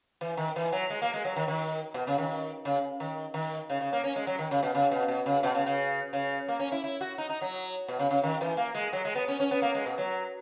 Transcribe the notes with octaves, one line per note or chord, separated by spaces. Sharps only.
E3
D#3
E3
F#3
G#3
A#3
G#3
F#3
D#3
D#3
B2
C#3
D#3
C#3
D#3
D#3
C#3
C#3
A#3
C#4
G#3
F#3
D#3
C#3
B2
C#3
B2
B2
C#3
B2
C#3
C#3
C#3
A#3
C#4
E4
E4
F#4
D#4
D#4
F#3
B2
C#3
C#3
D#3
E3
A#3
G#3
F#3
G#3
B3
C#4
C#4
B3
A#3
G#3
B2
F#3